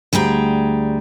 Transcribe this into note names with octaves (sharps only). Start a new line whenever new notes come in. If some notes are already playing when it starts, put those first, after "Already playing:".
D2 G3 G#4 G5 A#5